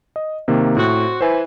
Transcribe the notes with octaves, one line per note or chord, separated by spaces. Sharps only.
D#5
C3 D#3 A#3
A2 C4 F#4
E3 C5 G#5